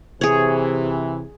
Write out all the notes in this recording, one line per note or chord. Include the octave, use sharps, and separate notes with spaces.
C3 E3 G#4 C#5